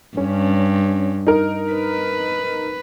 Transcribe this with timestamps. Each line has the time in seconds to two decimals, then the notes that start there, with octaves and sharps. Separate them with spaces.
0.17 G2 C#4
1.27 D#4 A#4
1.73 B4